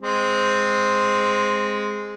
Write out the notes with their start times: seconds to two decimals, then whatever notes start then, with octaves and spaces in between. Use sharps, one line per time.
0.02 G#3 C4